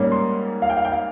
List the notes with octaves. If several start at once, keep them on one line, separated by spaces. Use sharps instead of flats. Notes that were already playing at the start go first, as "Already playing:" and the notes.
Already playing: G#2 G3 A#3 C#4
C6
F5
G5
F5
G5
F5